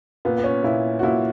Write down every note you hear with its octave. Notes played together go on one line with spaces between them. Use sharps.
A#2 B3
B3
C#4
A#2 E4
F#4
A#2 E4